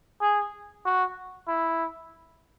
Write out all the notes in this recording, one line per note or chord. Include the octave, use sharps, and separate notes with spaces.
G#4
F#4
E4